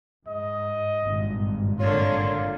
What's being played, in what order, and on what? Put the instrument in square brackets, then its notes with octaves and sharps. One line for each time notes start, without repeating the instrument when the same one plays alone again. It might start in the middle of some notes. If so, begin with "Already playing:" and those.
[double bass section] G#2 [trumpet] D#5
[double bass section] G#1 G2 A#2
[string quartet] D3 A#3 [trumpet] F4 [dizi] C#5